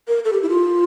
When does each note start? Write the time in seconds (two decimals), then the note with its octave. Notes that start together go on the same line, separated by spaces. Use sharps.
0.08 A#4
0.25 A4
0.33 G4
0.43 E4
0.49 F4